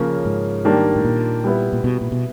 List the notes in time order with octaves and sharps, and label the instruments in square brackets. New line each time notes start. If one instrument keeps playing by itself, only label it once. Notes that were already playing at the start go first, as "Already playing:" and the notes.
Already playing: [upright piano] C#3 F3 A#3 C#4
[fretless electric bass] G#2
[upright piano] D#3 G3 A#3 D4
[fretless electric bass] A2
A#2
[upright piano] G3 B3 E4
[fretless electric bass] A#2
B2
A#2
B2